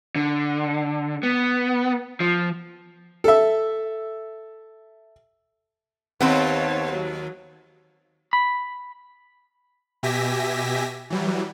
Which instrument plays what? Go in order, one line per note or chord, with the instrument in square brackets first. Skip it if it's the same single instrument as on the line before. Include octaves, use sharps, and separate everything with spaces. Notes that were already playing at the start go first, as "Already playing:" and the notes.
[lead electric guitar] D3
B3
F3
[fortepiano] A4 E5
[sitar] D#2 [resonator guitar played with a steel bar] B3 C4 C5 [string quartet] C#5 F5 A5
[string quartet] F#3
[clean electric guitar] B5
[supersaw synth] B2 G4 E5 G#5 A#6 B6
E3 F#3 G3